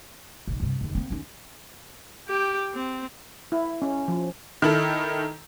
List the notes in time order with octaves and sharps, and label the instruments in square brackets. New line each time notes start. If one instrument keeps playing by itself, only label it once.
[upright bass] B1 B2
G2 C3
F#1 D#2
A#3 C4
D#2 C#4
[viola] G4 G5
C4
[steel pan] E4
C#4
F3
[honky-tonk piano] D#3 E4 A4